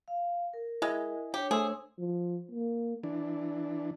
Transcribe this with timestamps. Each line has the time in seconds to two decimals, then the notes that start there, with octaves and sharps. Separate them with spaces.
0.08 F5
0.53 A#4
0.82 G#3 E4 D#5 G#5
1.34 D4 G4 C#5
1.51 A3 G#4 C5 E6
1.99 F3
2.52 A#3
3.03 E3 D4